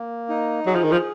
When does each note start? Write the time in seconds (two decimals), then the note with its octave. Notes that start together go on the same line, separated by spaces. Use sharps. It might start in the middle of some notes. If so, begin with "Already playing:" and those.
Already playing: A#3
0.29 D#4
0.66 F#3 G#4
0.75 F3
0.83 D#3
0.91 F3